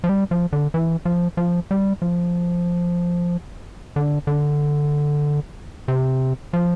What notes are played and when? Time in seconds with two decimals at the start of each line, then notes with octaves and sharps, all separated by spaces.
0.04 F3
0.09 G3
0.31 F3
0.53 D3
0.74 E3
1.05 F3
1.37 F3
1.71 G3
2.02 F3
3.96 D3
4.27 D3
5.88 C3
6.53 F3